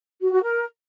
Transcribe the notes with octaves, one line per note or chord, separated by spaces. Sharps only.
F#4
F#4
A#4